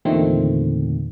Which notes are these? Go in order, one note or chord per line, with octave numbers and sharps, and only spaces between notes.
E2 A#2 D3 D#3 A3 C4